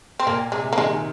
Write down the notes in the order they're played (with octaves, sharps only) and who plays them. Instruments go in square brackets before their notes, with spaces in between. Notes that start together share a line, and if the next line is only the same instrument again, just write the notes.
[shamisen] C4
[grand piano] A#2 [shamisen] A#3
[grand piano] C3 [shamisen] G#3
[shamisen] A#3
[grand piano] D#3 [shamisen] G#3